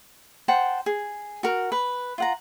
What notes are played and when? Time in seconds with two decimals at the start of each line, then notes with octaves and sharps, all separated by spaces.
0.48 C5 F#5 G5 A5
0.86 G#4
1.43 F#4 A#4
1.72 B4
2.18 F4 F#5 A#5